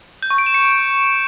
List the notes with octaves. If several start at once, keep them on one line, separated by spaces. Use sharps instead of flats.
G6
C#6
D7
E7
C#7